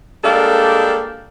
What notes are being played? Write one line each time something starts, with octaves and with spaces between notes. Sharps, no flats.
G3 G#3 A#3 D4 A4